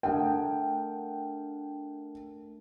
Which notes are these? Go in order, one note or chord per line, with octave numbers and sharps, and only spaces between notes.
A3 D4 A#4 F#5 G5